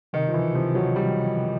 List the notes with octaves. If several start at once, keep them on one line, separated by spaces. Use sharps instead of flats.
C3 D#3
F3
E3
C3 F3
F#3
F3 G3